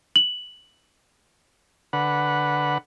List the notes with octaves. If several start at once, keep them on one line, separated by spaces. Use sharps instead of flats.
F#7
D3 B4 F#5